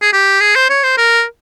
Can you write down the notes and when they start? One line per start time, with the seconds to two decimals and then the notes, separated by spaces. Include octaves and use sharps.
0.02 G#4
0.13 G4
0.41 G#4
0.55 C5
0.70 C#5
0.83 C5
0.98 A#4